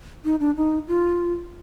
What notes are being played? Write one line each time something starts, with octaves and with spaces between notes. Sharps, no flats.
D#4
D4
D#4
F4